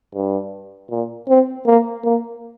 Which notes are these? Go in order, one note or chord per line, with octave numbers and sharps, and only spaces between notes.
G2
A#2
C4
A#3
A#3